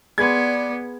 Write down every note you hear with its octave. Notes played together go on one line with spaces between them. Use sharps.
B3 G#4 B4 D5 C6 G#6